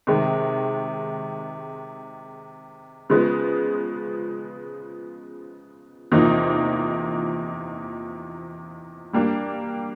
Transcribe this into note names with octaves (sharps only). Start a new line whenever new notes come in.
C3 D#3 G#3
C#3 F3 G#3 B3
E2 C3 F3 A#3 D#4
G3 A#3 D4